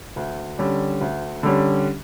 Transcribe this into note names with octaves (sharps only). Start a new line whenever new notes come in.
D2
D3 G3 C#4
D2
D3 G3 C#4